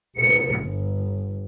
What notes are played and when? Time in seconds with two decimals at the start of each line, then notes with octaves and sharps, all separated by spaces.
0.18 C#7
0.59 G1